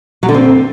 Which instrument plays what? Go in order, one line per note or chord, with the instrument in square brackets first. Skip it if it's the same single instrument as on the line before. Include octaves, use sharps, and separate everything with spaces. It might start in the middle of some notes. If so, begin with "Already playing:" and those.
[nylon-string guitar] F#3
D3
C4